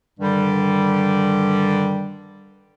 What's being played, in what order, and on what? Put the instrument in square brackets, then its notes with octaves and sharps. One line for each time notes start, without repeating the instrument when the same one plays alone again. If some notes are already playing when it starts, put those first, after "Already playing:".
[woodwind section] G2 D3 D#3 G3